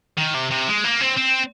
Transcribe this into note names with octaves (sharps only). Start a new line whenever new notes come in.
D#3
C3
C3
G#3
A#3
C4
C4